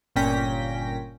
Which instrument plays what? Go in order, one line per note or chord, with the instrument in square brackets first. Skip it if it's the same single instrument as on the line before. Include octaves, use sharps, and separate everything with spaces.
[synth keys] G1 A#2 C#4 G5 A#6 B6